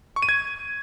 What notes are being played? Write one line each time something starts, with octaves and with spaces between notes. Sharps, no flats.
C#6
D#7
G#6